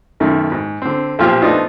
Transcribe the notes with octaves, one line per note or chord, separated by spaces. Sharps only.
B1 F#2 D#3 A3
G#2
D3 C4
B1 A#2 F3 F4 G4 F6
F3 A3 B3 D4 D#4 F4